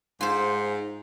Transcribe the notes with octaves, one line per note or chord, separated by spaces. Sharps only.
G#2 F4 C5